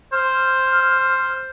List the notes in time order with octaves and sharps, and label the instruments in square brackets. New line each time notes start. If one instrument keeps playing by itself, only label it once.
[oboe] C5 [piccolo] F6